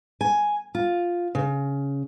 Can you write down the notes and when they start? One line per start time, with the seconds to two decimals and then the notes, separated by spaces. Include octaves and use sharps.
0.21 G#5
0.75 F4
1.35 C#3